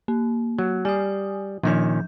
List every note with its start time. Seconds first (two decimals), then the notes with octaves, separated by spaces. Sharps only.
0.08 A#3
0.58 F#3
0.85 G3 G#5 D#6
1.63 A#2 D#3 F3 C#4 G6